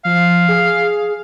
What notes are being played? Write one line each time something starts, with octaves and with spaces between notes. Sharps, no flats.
F3 F5
G#4